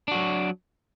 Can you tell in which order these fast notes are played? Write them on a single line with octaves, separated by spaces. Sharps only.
D4 F#4 F#3